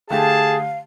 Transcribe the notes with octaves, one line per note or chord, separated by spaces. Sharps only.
D3 A3 G4 G#4 F5 A5